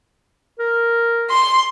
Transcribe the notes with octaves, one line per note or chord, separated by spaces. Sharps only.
A#4
C6